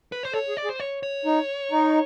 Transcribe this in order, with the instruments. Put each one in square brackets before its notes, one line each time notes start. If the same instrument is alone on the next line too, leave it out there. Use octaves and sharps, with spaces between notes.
[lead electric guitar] B4
C5
[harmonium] A4 [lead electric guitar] C#5
[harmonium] G#4
[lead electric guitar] D5
[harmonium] G#4
[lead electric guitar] C5
C#5
C#5
[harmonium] D#4
D#4